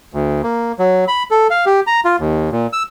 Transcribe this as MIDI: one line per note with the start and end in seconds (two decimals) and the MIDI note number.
0.14 0.42 38
0.43 0.72 58
0.79 1.05 54
1.08 1.23 83
1.31 1.47 69
1.50 1.65 77
1.66 1.80 67
1.87 2.01 82
2.05 2.16 65
2.20 2.50 39
2.52 2.67 46
2.73 2.83 88